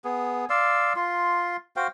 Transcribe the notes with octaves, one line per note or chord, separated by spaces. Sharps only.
B3 G#4
D5 F5 C6 E6
F4 C6
F#4 C5 F5 G5